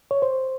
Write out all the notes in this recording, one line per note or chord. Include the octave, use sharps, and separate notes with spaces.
C#5
C5